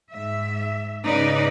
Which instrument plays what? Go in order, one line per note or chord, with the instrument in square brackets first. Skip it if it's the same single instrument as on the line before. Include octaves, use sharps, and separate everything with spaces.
[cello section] G#2 E5
G#2 C#3 D#4 B4 D5